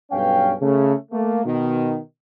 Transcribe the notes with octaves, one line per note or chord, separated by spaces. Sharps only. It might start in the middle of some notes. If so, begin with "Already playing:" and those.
B1 G2 C#4 F5 G5
C#3 A3
A3 A#3
B2 D#3